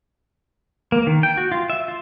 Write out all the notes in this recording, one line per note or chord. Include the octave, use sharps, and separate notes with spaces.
A#3
D#3
G5
F#4
F4
E5
F4